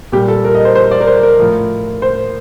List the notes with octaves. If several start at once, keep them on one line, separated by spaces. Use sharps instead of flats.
A#2 G3 G4
A4
A#4
D#5
C5
C5
D5
A#4
C5
A#4
A2 F3
C5